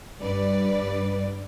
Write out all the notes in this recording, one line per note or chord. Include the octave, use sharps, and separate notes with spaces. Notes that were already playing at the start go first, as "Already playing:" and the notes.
G2 B4 D5